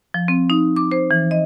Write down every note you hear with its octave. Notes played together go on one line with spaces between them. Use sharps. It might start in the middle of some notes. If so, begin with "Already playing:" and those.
F3
C4
D#4
D6
C5
E3
D#5